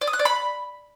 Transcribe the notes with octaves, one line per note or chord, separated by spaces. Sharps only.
D5
D#6
F#6
D5
B5